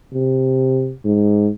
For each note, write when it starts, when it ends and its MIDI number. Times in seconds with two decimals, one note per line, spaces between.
0.14 0.94 48
1.05 1.50 44